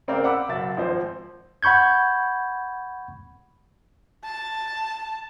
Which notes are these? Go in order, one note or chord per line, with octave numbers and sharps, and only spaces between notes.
C#3 C4 A#4 D5 F5 D6
F5 F#5 B5 D6 E6
F#1 F#3 E5 A6
G#1 F3 C5
F#5 B5 C#6 G6 G#6
A5